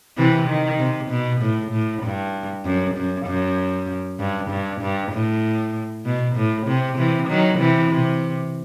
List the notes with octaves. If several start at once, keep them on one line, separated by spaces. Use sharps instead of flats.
C3 E3
D#3
C3
B2
A2
A2
G2
F#2
F#2
F#2
G2
G2
G2
A2
B2
A2
C3
C3 E3
D#3 F#3
C3 E3
C3